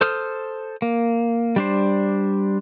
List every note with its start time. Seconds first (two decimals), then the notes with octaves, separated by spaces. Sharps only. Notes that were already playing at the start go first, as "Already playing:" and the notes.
0.01 A4 C5 D#6 F6
0.82 A#3
1.56 G3 D4 C5